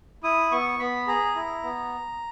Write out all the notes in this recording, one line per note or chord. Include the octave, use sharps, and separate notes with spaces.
E4 D#6
B3 C#6
B3 B5
G#4 A#5
E4
B3